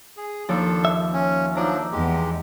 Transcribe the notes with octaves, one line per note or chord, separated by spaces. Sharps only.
G#4
D#2 F3 D4 A4 D5
E5
C#4
F3 F#3 D4 D#4 D5 A#5
E2 G#3 G4